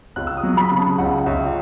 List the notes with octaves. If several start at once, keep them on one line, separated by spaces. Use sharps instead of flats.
C#2 F#6
E6
D#6
F#3
B5
C#3
A5
C#2 F#5
C#2 E5